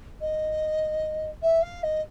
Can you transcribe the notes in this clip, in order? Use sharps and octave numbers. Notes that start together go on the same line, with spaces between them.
D#5
E5
F5
D#5